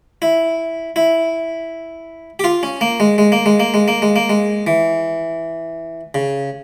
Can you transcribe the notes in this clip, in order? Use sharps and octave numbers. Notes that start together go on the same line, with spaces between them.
E4
E4
G4
F4
C#4
A#3
G#3
G#3
A#3
G#3
A#3
G#3
A#3
G#3
A#3
G#3
E3
C#3